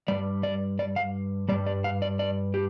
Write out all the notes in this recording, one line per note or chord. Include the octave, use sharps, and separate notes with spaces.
G2 G3 D5
D5
D5
F5
G2 G3 D5
D5
F5
D5
D5
G4